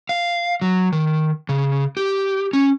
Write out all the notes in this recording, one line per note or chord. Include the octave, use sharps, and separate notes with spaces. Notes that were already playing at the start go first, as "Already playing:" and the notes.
F5
F#3
D#3
C#3
G4
C#4